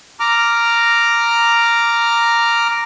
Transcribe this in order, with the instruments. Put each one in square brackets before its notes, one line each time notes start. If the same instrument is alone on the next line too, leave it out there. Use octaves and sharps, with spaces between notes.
[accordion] A#5 D6 F6